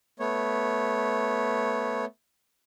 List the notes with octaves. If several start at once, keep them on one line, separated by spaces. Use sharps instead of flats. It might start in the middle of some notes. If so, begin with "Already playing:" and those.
A3 B3 C#5